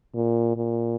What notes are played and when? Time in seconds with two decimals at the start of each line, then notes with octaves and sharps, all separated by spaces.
0.14 A#2
0.57 A#2